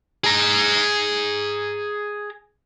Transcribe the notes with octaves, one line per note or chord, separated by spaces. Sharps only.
G#4 A#5